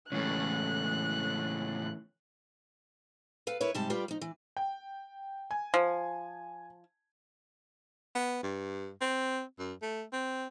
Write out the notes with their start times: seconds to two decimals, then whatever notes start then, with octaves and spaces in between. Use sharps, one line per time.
0.12 C#2 A2 E3 C#4 F#6
3.47 A4 B4 F5
3.61 E4 A#4 B4 C#5
3.74 G#2 C3 G3 C5 A5
3.90 G3 F4 G4 B4 D5
4.08 F3 D#4
4.21 E3
4.57 G5
5.51 G#5
5.74 F3
8.15 B3
8.43 G2
9.01 C4
9.59 F#2
9.82 A3
10.13 C4